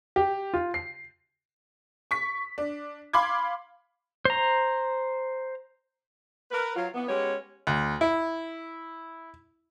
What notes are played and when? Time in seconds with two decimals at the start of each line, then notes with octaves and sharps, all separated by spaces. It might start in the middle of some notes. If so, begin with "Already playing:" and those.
0.16 G4
0.54 F4
0.74 C7
2.11 C#6 B6
2.58 D4
3.13 F5 B5 C6 D6 G#6
4.25 C5 A#5
6.52 A#4 B4
6.75 F#3 F4
6.94 E3 B3
7.07 G#3 B3 C#4 G4 C#5
7.67 D2
8.01 E4